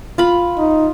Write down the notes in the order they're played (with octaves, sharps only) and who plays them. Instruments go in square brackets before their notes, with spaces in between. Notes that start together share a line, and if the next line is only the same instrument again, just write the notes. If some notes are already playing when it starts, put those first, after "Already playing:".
[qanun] F4 B5
[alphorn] D#4